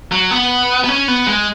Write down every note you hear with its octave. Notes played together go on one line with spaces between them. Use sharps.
F#3
B3
B3
C#4
B3
G#3